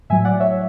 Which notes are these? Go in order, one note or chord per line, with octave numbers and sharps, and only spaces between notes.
A2 F#3 E5 G#5
D5 F#5
C#5 E5